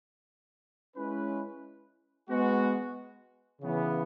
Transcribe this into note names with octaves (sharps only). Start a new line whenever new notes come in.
G#3 C#4 E4 B4
G#3 B3 F#4
C#3 E3 B3